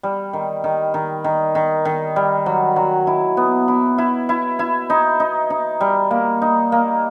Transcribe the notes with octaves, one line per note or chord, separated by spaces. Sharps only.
G3
D#3
D#3
D#3
D#3
D#3
D#3
G3
F#3
F#3
E4
B3
E4
E4
E4
E4
D#4
D#4
D#4
G3
A#3
D#4
A#3